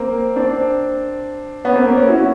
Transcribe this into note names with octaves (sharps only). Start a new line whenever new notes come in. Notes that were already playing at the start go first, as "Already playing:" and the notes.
Already playing: A#3 C4
C4 D4
B3 C#4
A#3 C4
A#3 C4
B3 C#4
E4 F#4